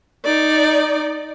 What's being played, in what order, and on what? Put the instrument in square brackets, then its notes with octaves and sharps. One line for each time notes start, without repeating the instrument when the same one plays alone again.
[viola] D#4 D5